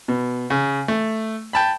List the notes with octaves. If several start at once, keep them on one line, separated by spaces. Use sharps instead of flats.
B2
C#3
A3
G5 A5 B5